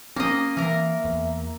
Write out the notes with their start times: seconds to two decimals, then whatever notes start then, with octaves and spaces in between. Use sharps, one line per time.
0.16 A#3 C4 C#4 D#5
0.57 E3 A#3 A#4 E5
1.04 E2